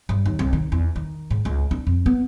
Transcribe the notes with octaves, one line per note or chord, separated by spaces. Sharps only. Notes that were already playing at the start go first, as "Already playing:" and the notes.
G2
D#2
C2
D#3
E2
D#3
G#2
C#2
D4
F2
B3